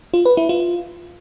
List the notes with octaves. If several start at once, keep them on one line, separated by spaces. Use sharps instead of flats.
F4
B4
E4
F4